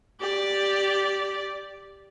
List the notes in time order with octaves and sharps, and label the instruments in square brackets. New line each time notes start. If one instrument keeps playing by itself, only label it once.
[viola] G4 D5